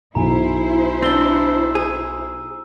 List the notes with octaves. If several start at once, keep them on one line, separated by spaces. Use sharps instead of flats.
B1 E4 C5 G#5 A#5
C4 D4 C6 E6 G7
G#4